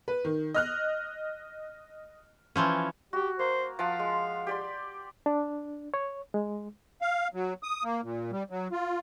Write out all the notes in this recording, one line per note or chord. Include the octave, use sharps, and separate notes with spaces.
B4
D#3
D#5 F6 F#6
E3 F3 C#4
F#4 G4
A#3 C5
F3 F5 F#5 A5
G#3
G4 D5 C6
D4
C#5
G#3
F5
F#3
D#6
A#3
A#2
G3
F#3
F4